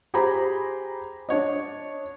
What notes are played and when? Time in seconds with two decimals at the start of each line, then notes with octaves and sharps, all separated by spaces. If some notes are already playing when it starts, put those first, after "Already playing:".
0.14 G4 G#4 C5 A#5 B5
1.29 D4 C#5 D#5